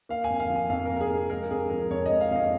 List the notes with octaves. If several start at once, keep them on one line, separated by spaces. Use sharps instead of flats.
A#3 F5
G#5
F2
F5
F3
G#5
F2 F5
A#4
A#3
A#4
G#4
F2
G#3 A#4
F2 G#4
F3 A#4
F2 C#5
G#3 D#5
F5
F2 D#5 F5